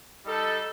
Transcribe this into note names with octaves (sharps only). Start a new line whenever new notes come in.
G3 D#4 A4